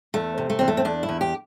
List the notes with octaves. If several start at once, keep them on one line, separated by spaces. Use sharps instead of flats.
E2 A3
C3
A3
E2 C4
A3
C4
E2 D4
E4
E2
G4